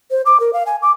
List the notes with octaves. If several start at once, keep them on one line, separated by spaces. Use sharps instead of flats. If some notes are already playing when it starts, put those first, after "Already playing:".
C5
D6
A#4
F5
G#5
D6